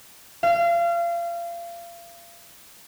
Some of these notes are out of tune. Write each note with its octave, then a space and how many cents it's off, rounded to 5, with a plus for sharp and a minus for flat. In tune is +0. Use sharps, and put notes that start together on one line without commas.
F5 -30